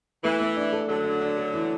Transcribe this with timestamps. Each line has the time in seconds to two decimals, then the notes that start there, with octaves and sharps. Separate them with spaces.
0.24 E3 A3
0.40 A3
0.57 D4
0.73 A4
0.88 D3 F#3 A4
1.05 D4
1.21 D4
1.38 A4
1.54 E3